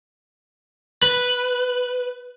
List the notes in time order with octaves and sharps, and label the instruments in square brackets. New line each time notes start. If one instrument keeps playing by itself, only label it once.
[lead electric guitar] B4